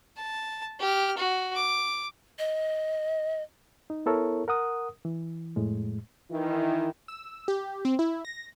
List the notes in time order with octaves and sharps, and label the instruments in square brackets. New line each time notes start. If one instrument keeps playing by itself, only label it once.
[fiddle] A5
G4 F6
F#4
D6
[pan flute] D#5
[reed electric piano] D#4
B3 E4 A4 A#4 C#5
A#4 F#5 D#6
E3
F2 A2 G#3
[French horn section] D#3 E3 E4
[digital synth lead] E6
G4
C4
E4
A#6